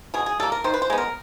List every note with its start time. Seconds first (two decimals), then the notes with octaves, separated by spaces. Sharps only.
0.14 B2 G#4
0.26 G#4
0.40 G3 A#3 A4
0.52 A#4
0.64 D#3 C5
0.74 B4
0.82 C5
0.90 G#3 B3
0.98 A#4